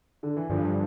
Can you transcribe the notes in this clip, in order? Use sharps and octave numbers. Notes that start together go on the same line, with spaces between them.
D3
E3
G2 D3 F3